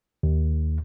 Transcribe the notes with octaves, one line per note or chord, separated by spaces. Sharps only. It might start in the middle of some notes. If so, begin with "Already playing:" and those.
D#2